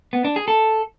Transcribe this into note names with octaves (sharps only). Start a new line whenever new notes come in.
B3
D4
G#4
A4